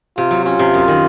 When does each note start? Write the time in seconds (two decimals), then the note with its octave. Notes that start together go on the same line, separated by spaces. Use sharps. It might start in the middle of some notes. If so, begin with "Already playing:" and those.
0.17 C3 F4
0.31 F#3
0.45 C#4 F4
0.59 C3
0.74 F#2
0.88 D#3